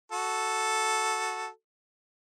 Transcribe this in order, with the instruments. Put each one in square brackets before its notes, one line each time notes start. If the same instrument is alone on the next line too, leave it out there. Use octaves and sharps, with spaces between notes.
[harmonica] F#4 A4